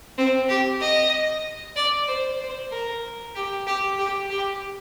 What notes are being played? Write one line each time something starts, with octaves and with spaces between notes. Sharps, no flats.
C4
G4
D#5
D5
C5
C5
A#4
G4
G4
G4
G4